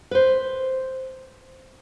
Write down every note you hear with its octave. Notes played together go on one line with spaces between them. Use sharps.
B4 C5